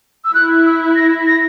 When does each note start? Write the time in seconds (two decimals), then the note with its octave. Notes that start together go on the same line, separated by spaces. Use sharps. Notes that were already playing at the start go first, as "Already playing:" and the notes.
0.25 E6
0.34 E4 F#6
0.66 E6
0.96 A#6
1.27 A#6